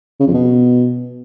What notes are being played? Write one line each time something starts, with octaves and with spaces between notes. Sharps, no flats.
C#3
F2
B2